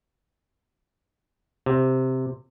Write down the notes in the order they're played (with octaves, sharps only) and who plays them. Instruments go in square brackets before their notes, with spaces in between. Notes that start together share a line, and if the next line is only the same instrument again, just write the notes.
[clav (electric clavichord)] C3